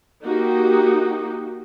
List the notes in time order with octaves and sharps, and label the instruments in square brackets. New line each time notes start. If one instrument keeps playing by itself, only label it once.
[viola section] A#3 D#4 F#4 G4